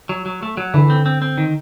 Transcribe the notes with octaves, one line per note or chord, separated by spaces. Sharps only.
F#3
F#3
A3
F#3
D3 E3
C4
C4
C4
D#3